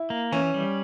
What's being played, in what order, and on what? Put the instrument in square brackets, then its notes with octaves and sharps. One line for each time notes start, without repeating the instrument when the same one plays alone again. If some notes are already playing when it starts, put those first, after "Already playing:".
Already playing: [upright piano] E4
[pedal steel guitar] A#3
[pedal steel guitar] E3 [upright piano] C#4
[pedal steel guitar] G3